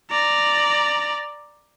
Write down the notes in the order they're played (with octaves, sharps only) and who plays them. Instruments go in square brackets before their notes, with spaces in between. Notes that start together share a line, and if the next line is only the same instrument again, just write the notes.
[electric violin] D5 A#5